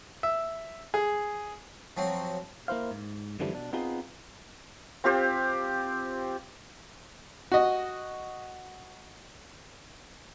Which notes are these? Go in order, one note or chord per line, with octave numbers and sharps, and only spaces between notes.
E5
G#4
F3 F#3 C4
A#3 E4 C5 F5
G#2
F#2 D3 E3 F3 G3 A3
B2 D4
B3 C4 D#4 F4 G#4
C4 F4 G4 C5
F#4 D#5